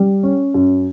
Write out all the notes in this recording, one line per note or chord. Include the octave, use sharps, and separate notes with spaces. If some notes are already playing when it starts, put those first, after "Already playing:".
Already playing: G3
C#4
F#2